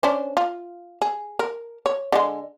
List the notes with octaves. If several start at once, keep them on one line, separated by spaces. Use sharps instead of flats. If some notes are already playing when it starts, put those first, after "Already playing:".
C#4 D4 C5
F4
G#4
A#4
C#5
D3 F#3 G#3